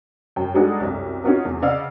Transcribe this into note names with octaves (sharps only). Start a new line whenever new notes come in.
F#2 G5
G3 G#3 D4 D#4 F#4 A4
C2 F#2
C#4 D#4 F4 F#4 A#4
E2
C#3 D5 D#5 F5 F#5 E6